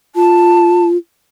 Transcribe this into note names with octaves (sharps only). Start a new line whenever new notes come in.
F4 A5